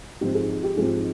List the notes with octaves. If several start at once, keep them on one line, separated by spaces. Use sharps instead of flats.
G#2 F3 C4 G4
G#4
G4
G#2 F3 C4 G#4